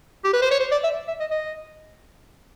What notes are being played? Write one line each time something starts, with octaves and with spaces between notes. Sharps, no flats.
G4
B4
C5
C#5
C5
D5
E5
E5
D#5
D#5